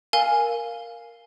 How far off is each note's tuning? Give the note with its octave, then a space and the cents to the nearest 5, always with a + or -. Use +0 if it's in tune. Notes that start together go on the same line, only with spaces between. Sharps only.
A#4 +0 F5 +0 G#5 +0